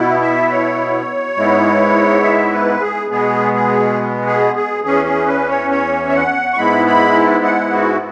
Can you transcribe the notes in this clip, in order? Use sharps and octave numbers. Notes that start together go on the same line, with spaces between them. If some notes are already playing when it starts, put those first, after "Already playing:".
Already playing: B2 B3 E4
E5
C#5
G#2 G#3 B3 E4
E5
B4
G#4
B2 G#3 B3 G#4
G#4
G#4
G#4
E2 E3 C#4 G#4
G#4
B4
C#5
C#5
E5
F#5
C#6
G#2 G#3 B3 E4 B5
B5
F#5
F#4